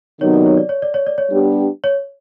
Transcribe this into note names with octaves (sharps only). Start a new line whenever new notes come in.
C3 D#3 F#3 B3 D#4 C#5
D5
C#5
D5
C#5
D5
C#5
D5
C#5
G3 B3 D4 G4
C#5